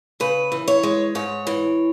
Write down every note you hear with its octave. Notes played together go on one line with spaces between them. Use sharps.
C#3 B4
E3
C#5
G#3
G#2 C#5
E3